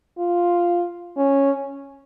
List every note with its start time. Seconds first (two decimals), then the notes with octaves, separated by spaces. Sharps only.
0.18 F4
1.17 C#4